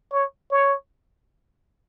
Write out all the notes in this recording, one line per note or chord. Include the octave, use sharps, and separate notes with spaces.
C#5
C#5